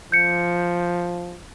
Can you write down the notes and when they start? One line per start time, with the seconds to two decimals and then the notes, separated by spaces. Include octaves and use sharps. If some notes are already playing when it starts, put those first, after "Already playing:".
0.12 F3 G6 C#7